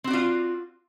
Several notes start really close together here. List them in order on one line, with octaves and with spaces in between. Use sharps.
C4 F#4 D5 F4